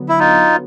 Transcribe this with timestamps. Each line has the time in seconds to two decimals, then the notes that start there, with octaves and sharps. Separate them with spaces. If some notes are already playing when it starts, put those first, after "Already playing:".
Already playing: D3 F#3 B3
0.09 E4
0.19 D#4 F4